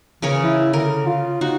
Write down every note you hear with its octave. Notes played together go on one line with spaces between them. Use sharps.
C#3 E3 A#4 C#5
E4
D3 A#4
F4
D#4 F#4